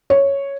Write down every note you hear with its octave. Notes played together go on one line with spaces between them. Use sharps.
C#5